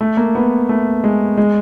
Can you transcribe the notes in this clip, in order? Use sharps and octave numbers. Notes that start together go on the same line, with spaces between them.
A3
A#3
B3
A3
G#3
G#3